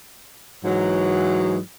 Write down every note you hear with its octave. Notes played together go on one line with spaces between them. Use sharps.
G#2 E3 F#3